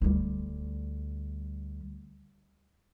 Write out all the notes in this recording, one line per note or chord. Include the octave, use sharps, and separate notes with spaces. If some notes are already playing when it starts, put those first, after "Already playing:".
D2 G3